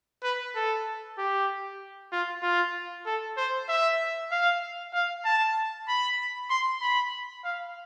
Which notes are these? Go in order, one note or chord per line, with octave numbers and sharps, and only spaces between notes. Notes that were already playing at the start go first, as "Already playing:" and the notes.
B4
A4
G4
F4
F4
A4
C5
E5
F5
F5
A5
B5
C6
B5
F5